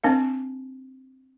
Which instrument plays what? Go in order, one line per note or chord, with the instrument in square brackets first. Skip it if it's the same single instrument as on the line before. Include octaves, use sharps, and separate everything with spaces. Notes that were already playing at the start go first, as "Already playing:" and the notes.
[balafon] C4 D4 A#4 F5